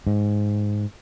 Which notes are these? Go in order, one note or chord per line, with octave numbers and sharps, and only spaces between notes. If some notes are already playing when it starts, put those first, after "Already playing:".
G#2